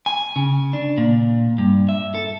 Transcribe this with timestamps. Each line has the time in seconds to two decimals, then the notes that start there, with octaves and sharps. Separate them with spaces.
0.06 G#5
0.36 C#3
0.73 D4
0.98 A#2
1.58 G2
1.89 E5
2.14 A4